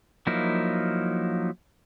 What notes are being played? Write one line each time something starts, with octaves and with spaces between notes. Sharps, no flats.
F3 F#3 A#3 D#4 E4